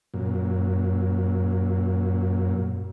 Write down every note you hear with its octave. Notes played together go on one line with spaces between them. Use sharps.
F#2 A#2